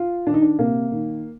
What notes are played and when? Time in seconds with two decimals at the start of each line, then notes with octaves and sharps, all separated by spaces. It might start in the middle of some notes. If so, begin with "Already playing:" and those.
Already playing: F4
0.27 D#3 D4
0.34 D#4
0.42 D4
0.59 C3 A#3
0.92 D#3